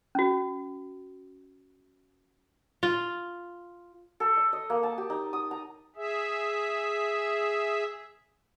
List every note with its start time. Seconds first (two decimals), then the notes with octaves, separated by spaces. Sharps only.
0.15 C#4 F#4
2.83 F4
4.20 A4
4.37 D#5
4.53 D#5
4.70 A#3
4.83 A5
4.98 G4
5.10 D#4
5.33 D#6
5.51 A#5
5.96 G#4 E5